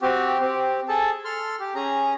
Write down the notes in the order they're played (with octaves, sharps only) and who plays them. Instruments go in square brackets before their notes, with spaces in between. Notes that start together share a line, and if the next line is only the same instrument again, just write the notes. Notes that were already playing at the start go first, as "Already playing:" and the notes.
[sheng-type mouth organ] C4 F#4 G4
C4 G4
G#4 A4 A5
A4 C6 F6
G4
C#4 G#4 A#5